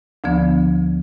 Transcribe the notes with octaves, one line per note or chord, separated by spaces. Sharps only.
D2 D3 F3 B3